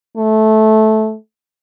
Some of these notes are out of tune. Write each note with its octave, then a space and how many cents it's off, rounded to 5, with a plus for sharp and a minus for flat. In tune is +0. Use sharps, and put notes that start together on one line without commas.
A3 -15